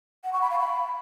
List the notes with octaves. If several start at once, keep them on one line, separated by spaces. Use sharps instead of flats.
F#5
C#6
B5
F5
B5